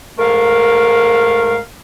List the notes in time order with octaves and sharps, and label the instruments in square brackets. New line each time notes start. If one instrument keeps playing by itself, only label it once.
[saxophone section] G#2 A3 A#4 F5